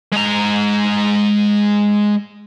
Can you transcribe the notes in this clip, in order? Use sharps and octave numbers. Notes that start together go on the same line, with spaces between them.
G#3 A#5